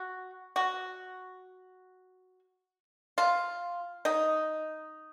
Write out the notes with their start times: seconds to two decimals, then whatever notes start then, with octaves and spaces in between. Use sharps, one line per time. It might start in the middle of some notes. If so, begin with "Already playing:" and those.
Already playing: F#4
0.56 F#4
3.18 F4
4.05 D#4